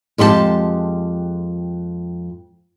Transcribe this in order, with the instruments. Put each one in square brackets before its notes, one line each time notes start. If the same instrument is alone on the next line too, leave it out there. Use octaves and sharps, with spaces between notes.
[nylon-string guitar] F2 G#3 G4 G#4 A5